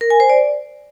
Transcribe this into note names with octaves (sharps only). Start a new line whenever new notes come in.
A#4
G#5
C5
D5